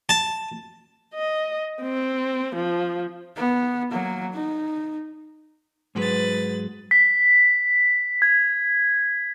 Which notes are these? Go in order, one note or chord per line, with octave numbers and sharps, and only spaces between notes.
A5
D#5
C4
F3
B3
F#3 A#3
D#4
G#2 F#3 G#3 B4 A6
B6
G#6